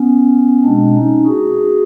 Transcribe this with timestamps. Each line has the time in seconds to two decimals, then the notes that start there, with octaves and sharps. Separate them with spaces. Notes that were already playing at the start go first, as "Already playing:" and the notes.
Already playing: B3 C#4
0.64 B2 G#3 C4 D4
0.95 C#4 D#4
1.27 F#4 G#4